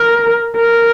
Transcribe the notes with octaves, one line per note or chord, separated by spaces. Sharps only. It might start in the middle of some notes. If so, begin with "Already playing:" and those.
Already playing: A#4
A#4